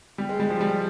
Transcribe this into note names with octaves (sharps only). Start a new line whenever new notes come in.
G3
G#3
G3
F3
G3